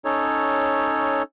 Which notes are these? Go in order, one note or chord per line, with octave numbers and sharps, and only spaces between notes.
C#4 D#4 A4 C#5